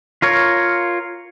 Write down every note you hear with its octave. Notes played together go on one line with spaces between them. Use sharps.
F4 A#4 C#5